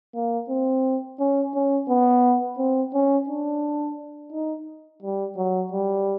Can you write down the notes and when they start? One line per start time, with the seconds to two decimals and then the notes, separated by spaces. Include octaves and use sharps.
0.15 A#3
0.49 C4
1.19 C#4
1.54 C#4
1.89 B3
2.58 C4
2.94 C#4
3.28 D4
4.32 D#4
5.03 G3
5.37 F#3
5.72 G3